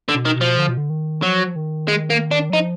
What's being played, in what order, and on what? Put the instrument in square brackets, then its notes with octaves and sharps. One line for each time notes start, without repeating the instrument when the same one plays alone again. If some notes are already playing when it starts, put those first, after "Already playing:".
[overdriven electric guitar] D3
[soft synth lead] B2
[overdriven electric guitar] D#3
[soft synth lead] B2
[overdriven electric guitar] F3
[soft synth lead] D3
B2
D3
D#3
[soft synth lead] F3 [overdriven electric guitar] F#3
[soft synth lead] D#3
[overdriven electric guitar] G#3
A#3
D4
[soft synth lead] F#3
[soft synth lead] F3 [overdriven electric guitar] D#4